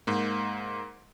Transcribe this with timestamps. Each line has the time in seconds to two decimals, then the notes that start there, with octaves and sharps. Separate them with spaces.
0.07 G#2 A#3